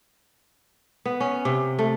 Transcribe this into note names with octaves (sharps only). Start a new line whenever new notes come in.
B3
C#4
C3
A3